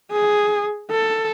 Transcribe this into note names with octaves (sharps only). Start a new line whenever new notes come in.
G#4
A4